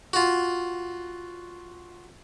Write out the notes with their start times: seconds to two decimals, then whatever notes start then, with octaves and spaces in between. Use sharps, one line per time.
0.13 F4 F#4